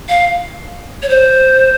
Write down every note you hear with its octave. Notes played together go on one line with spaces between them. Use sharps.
F5
C#5
C5